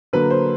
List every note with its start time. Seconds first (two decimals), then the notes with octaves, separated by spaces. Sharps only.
0.13 D3 F#3 A#3 B4
0.30 C5